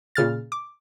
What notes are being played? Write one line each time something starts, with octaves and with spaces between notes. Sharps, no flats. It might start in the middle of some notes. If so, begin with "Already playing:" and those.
A#2 C#3 F6 A6
D6